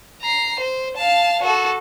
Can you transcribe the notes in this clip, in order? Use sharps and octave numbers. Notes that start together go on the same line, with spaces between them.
A#5 C7
C5
F5 A5
F#4 A4